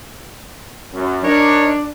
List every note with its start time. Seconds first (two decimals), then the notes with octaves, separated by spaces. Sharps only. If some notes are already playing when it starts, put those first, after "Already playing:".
0.94 F#2
1.24 D4 D#4 A#4 C#5